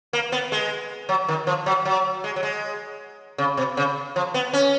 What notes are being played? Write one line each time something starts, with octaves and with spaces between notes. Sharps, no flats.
A#3
B3
G#3
F#3
D#3
F3
F#3
F#3
G#3
F#3
G#3
C#3
B2
C#3
F3
B3
C#4